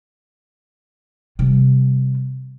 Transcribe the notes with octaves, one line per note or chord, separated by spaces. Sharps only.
C3 G3